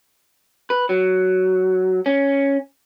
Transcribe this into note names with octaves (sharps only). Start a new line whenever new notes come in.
B4
F#3
C#4